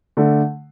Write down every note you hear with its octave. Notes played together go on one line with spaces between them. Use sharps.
D3 A3